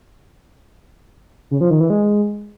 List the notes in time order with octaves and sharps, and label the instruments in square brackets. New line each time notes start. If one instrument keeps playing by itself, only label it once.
[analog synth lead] C#3
F3
D#3
E3
G#3